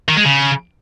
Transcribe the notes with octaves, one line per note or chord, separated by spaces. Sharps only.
D#3
G#3
C#3